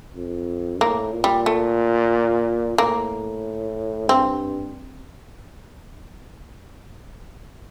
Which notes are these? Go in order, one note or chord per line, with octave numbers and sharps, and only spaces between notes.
F2
A2 A#3
A#2
G3
A3
A2 A#3
G2 C4